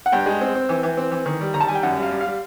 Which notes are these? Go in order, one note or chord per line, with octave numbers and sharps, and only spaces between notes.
F#5
G2 G5
G#3
C4
C4
E3
E3
C4
E3
D#3
G3
D#3 A#5
A5
G3 G#5
G5
F#2 F#5
G3
F5
G3
F5
G3